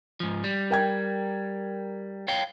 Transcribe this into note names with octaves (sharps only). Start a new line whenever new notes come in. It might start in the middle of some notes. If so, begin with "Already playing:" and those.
G#2 F3
G3
A#4 G5 G#6
C#5 F5 G5